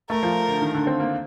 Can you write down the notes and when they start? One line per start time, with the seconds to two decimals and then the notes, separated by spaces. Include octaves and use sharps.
0.10 A3 A#4
0.23 F3
0.48 D3
0.62 D#3
0.74 D3
0.87 C4
1.00 A#3